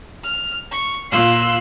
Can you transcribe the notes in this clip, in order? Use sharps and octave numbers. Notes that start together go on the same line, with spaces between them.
F6
C#6
A#2 F4 F5 C6 E6 F#6